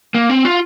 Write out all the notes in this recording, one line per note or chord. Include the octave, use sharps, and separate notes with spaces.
A#3
C4
F4